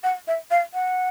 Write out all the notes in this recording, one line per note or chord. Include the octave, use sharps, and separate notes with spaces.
F#5
E5
F5
F#5